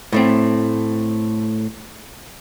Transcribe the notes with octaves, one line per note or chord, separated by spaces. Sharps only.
A2 A3 C4